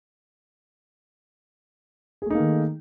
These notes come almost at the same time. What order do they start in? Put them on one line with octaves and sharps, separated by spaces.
G#4 A3 D#4 A#3 D#3